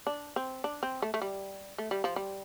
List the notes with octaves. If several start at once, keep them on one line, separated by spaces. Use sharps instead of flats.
D4
C4
D4
C4
A3
A3
G3
A3
G3
F3
G3